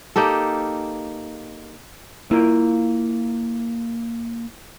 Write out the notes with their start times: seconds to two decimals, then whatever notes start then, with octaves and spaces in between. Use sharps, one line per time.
0.16 A#3 D#4 G4 A4
2.31 A#3 E4 F4 A#4